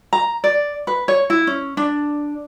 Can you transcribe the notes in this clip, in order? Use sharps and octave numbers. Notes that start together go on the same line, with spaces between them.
A#5
D5
B4
C#5
E4
C#4
D4